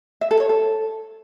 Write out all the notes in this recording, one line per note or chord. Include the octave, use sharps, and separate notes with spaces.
E5
A4
C#5
A4